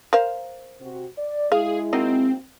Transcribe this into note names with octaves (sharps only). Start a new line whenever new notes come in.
A#4 C5 F5
C3 C4 F#4
D5
G#3 E4 G#4 F5
F#3 A#3 C4 D#4